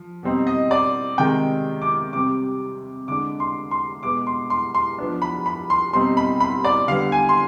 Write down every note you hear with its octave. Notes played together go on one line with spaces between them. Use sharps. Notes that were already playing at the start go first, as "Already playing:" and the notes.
Already playing: F3
B2 G3 C4 D#4
D#5
D5
C3 D#3 G#3 G5
D6
C3 G3 C4 D6
D3 G#3 D4 D6
C6
C6
B2 G#3 B3 D6
C6
C6
C6
F3 B3 D4
B5
B5
C6
B2 G3 C4 D#4 C6
B5
B5
D5
D3 G3 B3 F5
G#5
C6